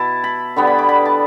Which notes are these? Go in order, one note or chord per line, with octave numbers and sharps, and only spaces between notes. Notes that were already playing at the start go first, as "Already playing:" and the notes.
Already playing: B2 E4 A5
B5
D3 G3 B3
B5
D6
B5
A5